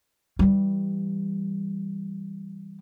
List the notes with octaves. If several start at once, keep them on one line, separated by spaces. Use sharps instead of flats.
E3 G3